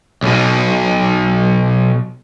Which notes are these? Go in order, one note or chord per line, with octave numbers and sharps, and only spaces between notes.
B1 B2